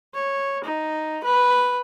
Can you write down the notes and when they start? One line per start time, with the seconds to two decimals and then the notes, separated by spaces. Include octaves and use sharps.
0.14 C#5
0.65 D#4
1.24 B4